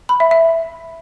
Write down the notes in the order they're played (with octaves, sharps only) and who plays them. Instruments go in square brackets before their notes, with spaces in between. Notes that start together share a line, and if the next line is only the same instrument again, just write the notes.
[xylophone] B5
E5
E5